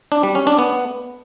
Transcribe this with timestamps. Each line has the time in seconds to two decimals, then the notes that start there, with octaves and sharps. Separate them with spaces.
0.12 D4
0.23 G3
0.35 C#4
0.47 D4
0.59 B3